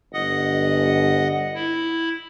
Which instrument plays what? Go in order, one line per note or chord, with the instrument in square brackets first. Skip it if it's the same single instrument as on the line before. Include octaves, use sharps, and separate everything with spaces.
[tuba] G1 [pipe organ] D#5 F#5 D#6
[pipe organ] E4